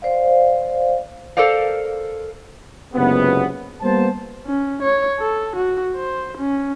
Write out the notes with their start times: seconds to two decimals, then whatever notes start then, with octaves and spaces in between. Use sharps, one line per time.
0.02 C5 D5 F5
1.37 A4 A#4 C5 D5 F5
2.94 F#1 C#2 C3 B3
3.82 G3 A#3 B3 C5 A5
4.46 C#4
4.82 C#5
5.20 A4
5.56 F#4
5.96 C5
6.38 C#4